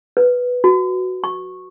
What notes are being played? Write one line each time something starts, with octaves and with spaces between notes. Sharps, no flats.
B4
F#4
C#6